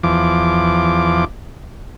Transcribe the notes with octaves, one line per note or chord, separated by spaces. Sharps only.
E2 F3 D6